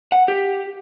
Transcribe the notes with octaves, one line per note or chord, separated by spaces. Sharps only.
F#5
G4